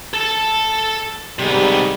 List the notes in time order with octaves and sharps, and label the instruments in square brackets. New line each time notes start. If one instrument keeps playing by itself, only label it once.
[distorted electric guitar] A4 A5
[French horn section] G#2 D#3 G3 [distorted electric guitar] C3 B3